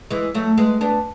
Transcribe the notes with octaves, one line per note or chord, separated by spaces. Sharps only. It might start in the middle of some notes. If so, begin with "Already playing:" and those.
E3 G#3
F#3 A3
G#3 B3
B3 D4